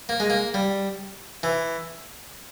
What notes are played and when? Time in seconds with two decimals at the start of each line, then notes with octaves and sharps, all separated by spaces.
0.09 A#3
0.20 G#3
0.30 A#3
0.54 G3
1.43 E3